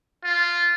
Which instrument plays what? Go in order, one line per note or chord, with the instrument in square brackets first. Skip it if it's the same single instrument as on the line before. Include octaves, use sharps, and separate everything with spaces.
[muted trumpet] F4